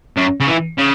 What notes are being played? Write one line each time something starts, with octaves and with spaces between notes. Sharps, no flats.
F#2
C#3
E3
C#3